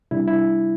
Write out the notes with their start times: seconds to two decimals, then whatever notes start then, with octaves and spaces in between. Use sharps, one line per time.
0.11 C3 G3 D4 E4
0.28 E4